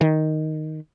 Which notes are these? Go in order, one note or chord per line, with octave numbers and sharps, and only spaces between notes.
D#3